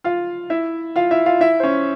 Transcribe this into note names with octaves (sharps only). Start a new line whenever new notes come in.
F4 F5
E4 E5
F4 F5
E4 E5
F4 F5
E4 E5
C5
C#4 C#5